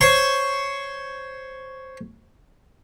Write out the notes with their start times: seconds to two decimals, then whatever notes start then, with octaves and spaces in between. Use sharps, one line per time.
0.01 C5 C#5 C6 C#6